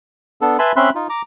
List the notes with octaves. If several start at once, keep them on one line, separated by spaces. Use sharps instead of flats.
B3 D4 A4
B4 E5 G#5 A5 B5 C6
C4 C#4 E5 B5 C6 F#6
D#4 F4
A#5 D6